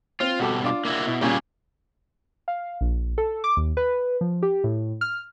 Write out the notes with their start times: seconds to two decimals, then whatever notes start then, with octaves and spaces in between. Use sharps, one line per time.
0.20 C4 F4
0.40 B2 G3 F#4 A4 D6
0.64 D4 F4 D6
0.85 A#3 E4 F#4
1.07 B2 E4
1.21 A#2 C#3 G3 A#3 G4 G#5
2.48 F5
2.81 A#1
3.18 A4
3.44 D6
3.57 D#2
3.77 B4
4.21 F3
4.43 G4
4.64 A2
5.01 F6